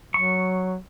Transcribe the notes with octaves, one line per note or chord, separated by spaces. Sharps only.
F#3 C#6